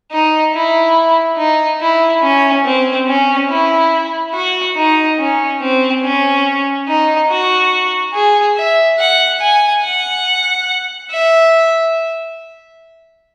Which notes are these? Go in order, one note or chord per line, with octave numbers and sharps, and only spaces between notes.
D#4
E4
D#4
E4
C#4
C4
C#4
E4
F#4
D#4
C#4
C4
C#4
D#4
F#4
G#4
E5
F#5
G#5
F#5
E5